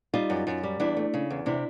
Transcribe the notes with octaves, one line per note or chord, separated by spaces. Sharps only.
G3 D#4 F4
F#2
F#2
G3
E2 D4 E4
A3
C#3
E2
C3 D4 E4